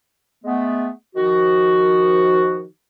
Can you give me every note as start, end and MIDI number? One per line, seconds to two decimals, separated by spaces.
0.44 0.88 56
0.44 0.88 57
0.44 0.88 59
1.16 2.65 51
1.16 2.65 53
1.16 2.65 66